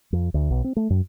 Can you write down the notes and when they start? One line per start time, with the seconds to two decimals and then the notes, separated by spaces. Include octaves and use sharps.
0.13 F2
0.34 D2
0.51 B1
0.64 C4
0.76 A3
0.90 F#2